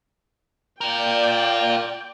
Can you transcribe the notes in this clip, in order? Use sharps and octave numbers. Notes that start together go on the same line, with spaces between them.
F4 A#4 D5 G5